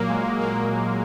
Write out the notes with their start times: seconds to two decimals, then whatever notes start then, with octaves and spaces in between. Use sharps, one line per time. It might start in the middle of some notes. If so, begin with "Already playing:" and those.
Already playing: A#2 F#3 A#3
0.10 G#3
0.41 A#3